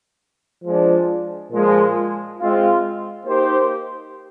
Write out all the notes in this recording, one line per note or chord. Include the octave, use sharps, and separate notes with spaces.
F3 G#3 D4
A#2 F3 G#3
G#3 C4 F4
A#3 D#4 G4 C5